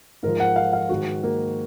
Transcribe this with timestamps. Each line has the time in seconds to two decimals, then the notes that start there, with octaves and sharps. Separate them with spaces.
0.23 G#2 F3 A#4
0.40 F#5
0.56 F5
0.73 F5
0.89 G#2 D#3 F#4
1.23 A#3